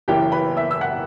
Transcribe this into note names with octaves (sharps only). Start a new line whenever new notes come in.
F#1 F#2 E3 G4 G5
B4 B5
E5 E6
E6
F#5 F#6